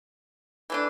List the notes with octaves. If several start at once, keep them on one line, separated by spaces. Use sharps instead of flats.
E3 A3 D4